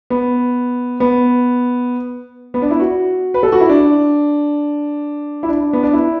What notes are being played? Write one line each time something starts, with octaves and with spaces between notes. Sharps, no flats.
B3
B3
B3
D4
E4
F#4
B4
A4
F#4
E4
D4
E4
D4
B3
D4
E4